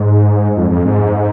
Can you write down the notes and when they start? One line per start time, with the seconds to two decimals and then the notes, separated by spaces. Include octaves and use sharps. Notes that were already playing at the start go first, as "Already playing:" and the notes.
Already playing: G#2
0.57 F2
0.71 F2
0.85 G#2